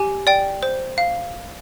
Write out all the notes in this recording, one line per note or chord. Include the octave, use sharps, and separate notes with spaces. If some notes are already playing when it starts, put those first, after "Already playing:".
Already playing: G4 G#5
D5 G5
C5
F5